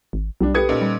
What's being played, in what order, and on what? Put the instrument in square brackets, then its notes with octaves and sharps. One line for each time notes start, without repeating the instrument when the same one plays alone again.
[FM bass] G#1
[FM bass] B1 [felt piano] G3 D4
[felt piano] G4 A4 B4 [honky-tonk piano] D#6 G#6 C#7
[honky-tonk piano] A#2 C#4 D#4
[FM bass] G3